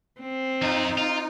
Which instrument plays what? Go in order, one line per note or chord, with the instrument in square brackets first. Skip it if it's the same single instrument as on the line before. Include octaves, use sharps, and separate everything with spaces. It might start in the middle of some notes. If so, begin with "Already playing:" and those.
[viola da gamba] C4
[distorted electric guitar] F2 F4 [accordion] D#4
[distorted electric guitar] F4